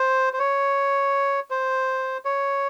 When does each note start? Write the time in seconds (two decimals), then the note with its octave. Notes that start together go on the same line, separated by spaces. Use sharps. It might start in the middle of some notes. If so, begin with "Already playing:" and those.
Already playing: C5
0.33 C5
0.39 C#5
1.51 C5
2.25 C#5